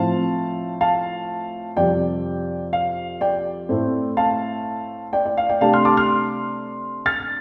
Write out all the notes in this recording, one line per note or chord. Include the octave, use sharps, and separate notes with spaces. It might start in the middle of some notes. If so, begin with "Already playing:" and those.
Already playing: A2 F3 C4 F5 A5
F5 A5
F2 C3 G3 D5 G5
F5
D5 G5
A2 A3 C4
F5 A5
D5 G5
D5
F5
D5 G5
C3 A3 D4 F5 A5
C6 F6
A5 D6
C6 F6
F6 A6